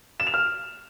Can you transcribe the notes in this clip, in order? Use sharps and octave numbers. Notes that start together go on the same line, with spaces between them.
E7
F7
F6